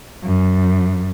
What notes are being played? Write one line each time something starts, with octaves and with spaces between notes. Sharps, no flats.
F#2